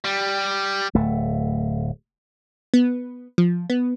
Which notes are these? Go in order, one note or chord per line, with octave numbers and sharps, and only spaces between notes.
G3
D1 A3
B3
F3
B3